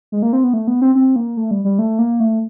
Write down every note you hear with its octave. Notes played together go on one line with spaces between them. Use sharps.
G#3
A#3
C4
B3
A3
B3
C4
C4
A#3
A3
G3
G3
A3
A#3
A3